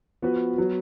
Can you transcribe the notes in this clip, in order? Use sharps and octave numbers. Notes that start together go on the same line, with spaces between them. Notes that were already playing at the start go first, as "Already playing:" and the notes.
F3 B3 F#4 B4
F#3 B3